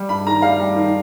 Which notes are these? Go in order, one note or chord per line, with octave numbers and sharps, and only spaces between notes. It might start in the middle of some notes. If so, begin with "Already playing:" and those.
Already playing: G3
G2 B5
D#3 A#5
G3 F5
G3
D#3